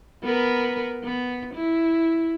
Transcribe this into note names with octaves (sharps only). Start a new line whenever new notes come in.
B3 A#4 B4
B3
E4